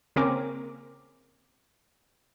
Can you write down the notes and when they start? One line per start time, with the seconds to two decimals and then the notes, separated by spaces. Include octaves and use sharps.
0.16 C#3 A#3 C4 C#4 A#4 D6